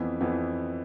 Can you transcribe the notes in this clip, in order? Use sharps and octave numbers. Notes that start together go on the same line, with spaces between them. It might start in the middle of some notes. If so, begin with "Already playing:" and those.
Already playing: F2 E3 B3
F2 E3 B3